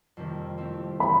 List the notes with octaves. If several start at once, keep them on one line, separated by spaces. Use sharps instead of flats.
F2 C3 D#3 G3 A#3
A3 C4 E4 G4
E3 A3 B5